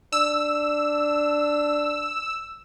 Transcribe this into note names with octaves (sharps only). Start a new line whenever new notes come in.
D4 E6